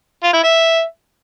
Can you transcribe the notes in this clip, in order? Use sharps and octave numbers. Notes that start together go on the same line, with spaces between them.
F4
E4
E5